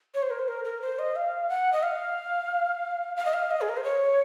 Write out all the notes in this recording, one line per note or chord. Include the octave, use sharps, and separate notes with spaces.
C#5
C5
A#4
C5
A#4
A#4
C5
D#5
F5
F#5
D#5
F5
F5
D#5
F5
D#5
G#4
A#4
C5
C#5